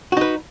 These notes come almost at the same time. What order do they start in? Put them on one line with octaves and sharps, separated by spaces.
F#4 D#4 B4